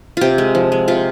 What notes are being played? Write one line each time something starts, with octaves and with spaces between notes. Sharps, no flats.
C3 F4 G4
G#3
F3
G#3
C3 F4